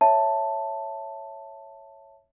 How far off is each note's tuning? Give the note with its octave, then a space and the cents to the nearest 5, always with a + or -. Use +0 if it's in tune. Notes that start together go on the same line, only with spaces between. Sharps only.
C#5 -5 E5 +0 A5 +5